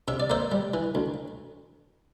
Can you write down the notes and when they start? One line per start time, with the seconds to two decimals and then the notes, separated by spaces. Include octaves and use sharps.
0.08 C3 E5
0.20 D5
0.30 A#3 C5 E5
0.52 G3
0.74 E3
0.95 D2